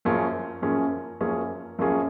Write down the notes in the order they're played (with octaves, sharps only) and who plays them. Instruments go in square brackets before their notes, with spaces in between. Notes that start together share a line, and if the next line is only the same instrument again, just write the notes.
[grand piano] F#2 F3 A#3 C#4 G#4
F#2 F3 A#3 C#4 G#4
F#2 F3 A#3 C#4 G#4
F#2 F3 A#3 C#4 G#4